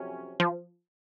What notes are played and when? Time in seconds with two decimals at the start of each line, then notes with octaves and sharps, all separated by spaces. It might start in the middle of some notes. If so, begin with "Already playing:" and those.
Already playing: F2 C3 F#3 C#4
0.40 F3